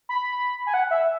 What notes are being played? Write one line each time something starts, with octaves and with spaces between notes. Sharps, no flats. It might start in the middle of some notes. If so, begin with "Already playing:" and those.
B5
G#5
F#5
E5